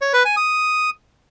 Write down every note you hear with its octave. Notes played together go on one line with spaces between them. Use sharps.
C#5
B4
G#5
D#6